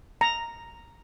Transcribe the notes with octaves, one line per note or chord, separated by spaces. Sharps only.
A#5